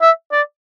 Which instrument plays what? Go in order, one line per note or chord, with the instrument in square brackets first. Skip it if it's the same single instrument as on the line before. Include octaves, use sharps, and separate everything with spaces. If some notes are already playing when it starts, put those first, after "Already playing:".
[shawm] E5
D5